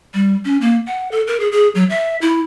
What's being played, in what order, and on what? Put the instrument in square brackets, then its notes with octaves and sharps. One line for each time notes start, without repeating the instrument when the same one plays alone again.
[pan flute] G3
C#4
A#3
F#5
A4
A#4
G#4
G#4
F#3
E5
E4